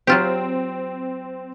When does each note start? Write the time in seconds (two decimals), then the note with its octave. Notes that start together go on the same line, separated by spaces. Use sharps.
0.07 F#3 C4 F4 G4